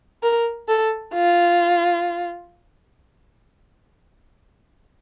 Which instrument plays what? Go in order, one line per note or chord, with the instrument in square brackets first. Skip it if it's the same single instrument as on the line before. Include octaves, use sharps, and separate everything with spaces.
[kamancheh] A#4
A4
F4